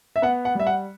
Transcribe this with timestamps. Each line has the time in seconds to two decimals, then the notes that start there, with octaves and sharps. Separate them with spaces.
0.16 E5
0.22 B3 F#5
0.45 F#5
0.55 G3 E5
0.67 F#5